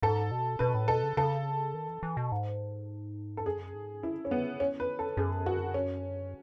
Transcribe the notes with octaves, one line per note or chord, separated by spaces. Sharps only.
G#2 A4
B2
B2 B4
A2
B2 A4
C#3
C#3 A4
D#3
E3
E3
B2
G#2
A4
F#2 G#4
G#2
E4
C#4
B3
C#4
B4
A4
F#2 G#4
F#4
C#4